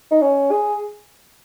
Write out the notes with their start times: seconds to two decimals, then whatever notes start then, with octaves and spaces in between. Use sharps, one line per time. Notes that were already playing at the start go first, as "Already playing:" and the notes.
0.11 D#4
0.22 C#4
0.51 G#4